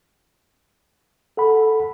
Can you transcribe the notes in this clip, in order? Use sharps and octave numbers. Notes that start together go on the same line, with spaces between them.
A4 F#5 B5